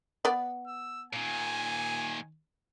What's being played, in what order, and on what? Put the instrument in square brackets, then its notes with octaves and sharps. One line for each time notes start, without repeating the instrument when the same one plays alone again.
[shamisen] B3 D5
[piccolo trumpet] E6
[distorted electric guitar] A#2 D#3 [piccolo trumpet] G#5